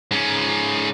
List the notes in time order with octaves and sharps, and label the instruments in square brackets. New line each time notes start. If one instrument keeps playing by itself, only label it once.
[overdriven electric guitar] G#2 C#4